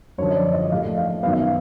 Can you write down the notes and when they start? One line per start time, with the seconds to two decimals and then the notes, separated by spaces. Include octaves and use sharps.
0.18 F#2 D3 F3 C#5
0.30 D#5
0.36 D5
0.53 D#5
0.71 A2 F3 A3 F5
0.97 F5
1.23 F#2 D#3 F#3 B3 F5
1.33 E5
1.41 F5